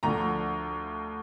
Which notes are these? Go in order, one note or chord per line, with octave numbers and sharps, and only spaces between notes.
D2 D3 F3 A#5